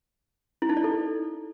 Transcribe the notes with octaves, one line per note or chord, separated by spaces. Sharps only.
E4
D#4
D5
A4